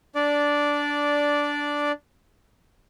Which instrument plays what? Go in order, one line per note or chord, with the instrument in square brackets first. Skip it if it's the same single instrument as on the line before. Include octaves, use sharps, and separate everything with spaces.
[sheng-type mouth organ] D4 D5